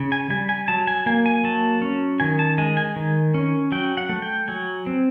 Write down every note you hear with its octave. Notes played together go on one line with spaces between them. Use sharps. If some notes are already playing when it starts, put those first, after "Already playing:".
Already playing: C#3
G#5
G3 G#5
G#5
F#3 A5
G#5
A#3 G#5
G#5
F#3 A5
C#4
D#3 G#5
A5
G#3 G#5
G#5
D#3
C#4
F#3 G5
F#5
A3
G5
F#3 G#5
C4